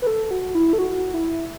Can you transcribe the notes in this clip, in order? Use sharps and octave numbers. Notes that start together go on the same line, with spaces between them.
B4
A4
F#4
E4
A4
F#4
E4